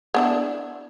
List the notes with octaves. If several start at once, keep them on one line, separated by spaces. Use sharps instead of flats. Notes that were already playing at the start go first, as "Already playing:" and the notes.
B3 D4 E4